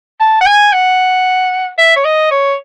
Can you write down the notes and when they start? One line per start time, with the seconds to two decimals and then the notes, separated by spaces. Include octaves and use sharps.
0.20 A5
0.41 F#5
0.46 G#5
0.73 F#5
1.78 E5
1.96 C#5
2.05 D#5
2.31 C#5